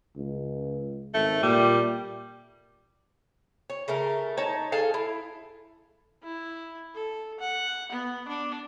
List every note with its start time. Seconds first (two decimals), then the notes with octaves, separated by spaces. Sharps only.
0.16 C#2
1.14 G#1 A3
1.43 A#2 G3
3.70 C#5
3.88 C#3 A3 A#4
4.37 D#4 C#5 A5 A#5
4.72 G#4 A4 F5 A5
4.94 E4
6.23 E4
6.95 A4
7.40 F#5
7.92 B3
8.28 D4